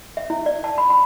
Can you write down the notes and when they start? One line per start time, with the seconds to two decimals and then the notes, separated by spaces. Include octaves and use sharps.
0.17 E5
0.30 E4
0.46 D5
0.64 A5
0.78 B5
0.90 B5